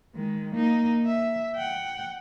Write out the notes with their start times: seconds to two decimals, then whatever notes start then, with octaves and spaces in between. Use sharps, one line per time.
0.15 D#3 G#3
0.53 A#3 D#4
1.06 E5
1.55 F#5 G5